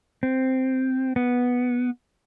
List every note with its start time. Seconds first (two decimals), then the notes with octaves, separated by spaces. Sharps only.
0.23 C4
1.16 B3